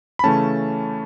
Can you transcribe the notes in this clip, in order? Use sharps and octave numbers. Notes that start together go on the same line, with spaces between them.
B5
C#3 E3 A3 C#4 A5